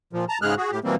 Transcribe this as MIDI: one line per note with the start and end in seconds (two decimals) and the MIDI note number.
0.13 0.25 46
0.13 0.25 53
0.29 0.38 81
0.29 0.38 82
0.42 0.55 44
0.42 0.55 49
0.42 0.55 56
0.42 0.55 68
0.42 0.55 89
0.42 0.55 90
0.57 0.71 66
0.57 0.71 68
0.71 0.79 45
0.71 0.79 67
0.84 0.95 47
0.84 0.95 52
0.84 0.95 55
0.84 0.95 58
0.84 0.95 60